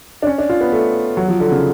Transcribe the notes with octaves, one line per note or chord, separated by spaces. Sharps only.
D4
C#4
D4
F4
B3
A3
F#3
F3
D3
C#3